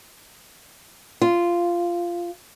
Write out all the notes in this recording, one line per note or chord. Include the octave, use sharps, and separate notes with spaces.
F4